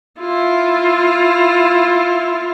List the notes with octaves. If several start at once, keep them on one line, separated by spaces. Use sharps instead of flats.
E4 F4